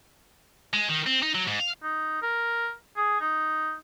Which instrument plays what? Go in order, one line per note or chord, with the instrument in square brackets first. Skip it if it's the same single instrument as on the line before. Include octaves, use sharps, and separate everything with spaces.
[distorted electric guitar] G#3
D#3
C4
D#4
F#3
G#2
F5
[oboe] D#4
A#4
G#4
D#4